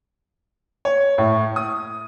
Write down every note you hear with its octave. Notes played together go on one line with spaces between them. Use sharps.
C#5
A2
D#6